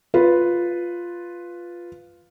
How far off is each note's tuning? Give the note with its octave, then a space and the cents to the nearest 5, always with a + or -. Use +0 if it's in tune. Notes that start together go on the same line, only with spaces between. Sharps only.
F4 +0 B4 +0